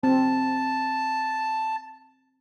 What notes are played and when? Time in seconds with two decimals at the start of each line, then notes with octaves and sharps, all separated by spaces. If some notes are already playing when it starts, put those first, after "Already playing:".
0.03 C4 A5